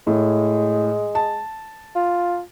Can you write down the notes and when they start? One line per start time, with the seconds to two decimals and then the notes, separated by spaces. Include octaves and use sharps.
0.07 A2 G#3
1.15 A5
1.96 F4